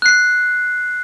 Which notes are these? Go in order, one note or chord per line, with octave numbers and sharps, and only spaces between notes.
F#6 C7